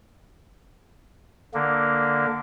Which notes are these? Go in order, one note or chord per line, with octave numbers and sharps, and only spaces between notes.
D3 A#3